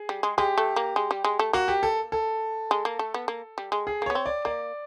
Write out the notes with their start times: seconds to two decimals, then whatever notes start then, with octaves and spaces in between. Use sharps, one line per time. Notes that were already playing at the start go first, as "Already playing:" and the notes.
Already playing: G#4
0.09 G3
0.23 G#3
0.38 G#3 G4
0.58 A3
0.76 A#3
0.96 G#3
1.11 G3
1.24 G#3
1.39 A3
1.53 A#3 F#4
1.68 G4
1.83 A4
2.12 A4
2.71 G#3
2.85 A#3
2.99 A3
3.14 B3
3.28 A#3
3.58 G3
3.72 G#3
3.87 G#4
4.02 A#3
4.06 B3 C#5
4.15 C4
4.26 D5
4.45 A#3 D5